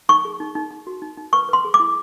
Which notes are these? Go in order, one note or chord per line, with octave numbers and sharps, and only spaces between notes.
D#4 C#6
G#4
D#4
D#4
D#4
F#4
D#4
D#4
B4 C#6
B4 C6
G#4
D6
E4